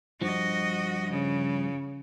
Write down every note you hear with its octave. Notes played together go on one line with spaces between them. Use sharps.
G2 F3 F#4 D#5
C#3